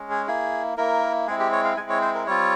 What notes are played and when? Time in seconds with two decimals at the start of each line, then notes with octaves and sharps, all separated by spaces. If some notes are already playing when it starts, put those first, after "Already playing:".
Already playing: G#3 C#4
0.10 G#4
0.27 A#3 E4 G#4
0.77 A#3 E4 A#4
1.27 G#3 C4 E4 G#4
1.40 G4
1.52 C#5
1.65 F5
1.77 G#3 C4 E4 G#5
1.89 C#5
2.02 C5
2.15 A#4
2.27 G3 C4 F4 C#5